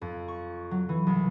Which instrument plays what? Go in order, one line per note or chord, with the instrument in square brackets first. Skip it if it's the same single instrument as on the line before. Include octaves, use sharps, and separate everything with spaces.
[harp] F2
C#6
F#3
E3
C2